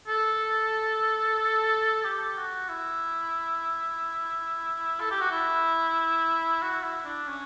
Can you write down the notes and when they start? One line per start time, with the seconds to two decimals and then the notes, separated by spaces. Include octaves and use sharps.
0.08 A4
2.04 G4
2.37 F#4
2.69 E4
5.00 A4
5.11 G4
5.21 F#4
5.31 E4
6.62 F#4
6.83 E4
7.05 D4
7.27 C#4